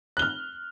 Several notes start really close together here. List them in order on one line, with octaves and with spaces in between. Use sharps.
F#6 G7 F6